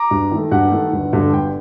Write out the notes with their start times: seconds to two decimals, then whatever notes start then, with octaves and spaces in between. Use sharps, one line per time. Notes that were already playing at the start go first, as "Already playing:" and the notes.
Already playing: A#5 D6
0.11 G2
0.31 D#3 A3
0.51 G2 F#5
0.72 D#3 A3
0.92 G1
1.13 G2 D3 A3
1.33 G1 G5